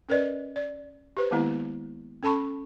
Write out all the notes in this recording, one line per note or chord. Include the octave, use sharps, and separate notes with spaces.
C#4 A#4 B4 D5 D#5
D5
G4 B4 C5
D#3 G#3 A#3 B3 E4
C#4 A4 A5 B5 C#6